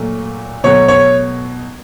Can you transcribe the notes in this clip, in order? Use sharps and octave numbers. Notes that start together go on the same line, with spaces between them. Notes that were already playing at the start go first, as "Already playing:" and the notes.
Already playing: A#2 F#3 A3
B2 F#3 A3 C#5
C#5